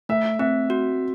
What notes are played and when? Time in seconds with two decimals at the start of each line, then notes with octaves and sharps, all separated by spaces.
0.09 A3 E5
0.39 C4 E5
0.70 F#4